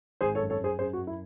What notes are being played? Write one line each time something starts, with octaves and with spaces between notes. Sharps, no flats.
G#1 G#4 C5
A4 C#5
F#2
A4 C#5
F#2 G#4 C5
F#2 G#4 C5
F#4
F#2
E4